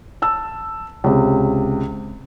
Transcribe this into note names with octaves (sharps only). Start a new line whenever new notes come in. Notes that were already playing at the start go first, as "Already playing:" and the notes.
A5 E6
C#2 C3